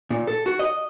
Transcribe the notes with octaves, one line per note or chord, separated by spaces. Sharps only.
A#2
A4
F#4
D#5